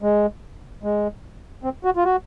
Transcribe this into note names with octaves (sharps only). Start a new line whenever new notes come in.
G#3
G#3
C4
F#4
F4
F#4